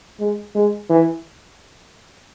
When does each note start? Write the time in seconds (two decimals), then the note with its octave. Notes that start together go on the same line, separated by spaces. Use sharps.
0.20 G#3
0.55 G#3
0.89 E3